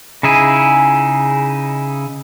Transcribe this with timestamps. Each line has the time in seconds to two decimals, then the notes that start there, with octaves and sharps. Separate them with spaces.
0.23 C#3 D#4 E4 G#4